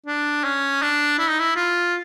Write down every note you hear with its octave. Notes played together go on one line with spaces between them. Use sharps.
D4
C#4
D4
E4
D#4
E4
F4